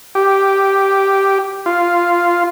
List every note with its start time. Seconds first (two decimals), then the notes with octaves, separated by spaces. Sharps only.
0.15 G4
1.66 F4